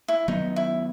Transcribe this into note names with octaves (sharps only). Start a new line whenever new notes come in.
E4
D#3 F#3 B3 D#4
E4